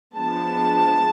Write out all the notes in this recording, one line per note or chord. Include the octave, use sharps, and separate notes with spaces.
F3 G#3 B3 D4 A5